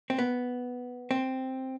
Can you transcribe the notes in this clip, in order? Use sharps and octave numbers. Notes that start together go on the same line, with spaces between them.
C4
B3
C4